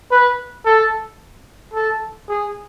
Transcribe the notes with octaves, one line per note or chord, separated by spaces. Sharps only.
B4
A4
A4
G#4